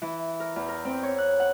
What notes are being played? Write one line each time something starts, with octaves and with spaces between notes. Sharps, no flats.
E3
A#4
E2
A#4
C4
C#5
F#6
F#5